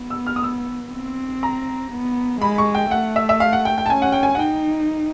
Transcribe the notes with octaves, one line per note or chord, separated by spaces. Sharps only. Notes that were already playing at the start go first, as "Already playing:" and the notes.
Already playing: B3
E6
F6
D#6
E6
C4
A#5
B3
G#3 B5
C#6
G5
A3 F#5
E5
E5
F5
F#5
G5
G5
A5
C#4 G#5
F#5
G5
G#5
F#5
D#4 G5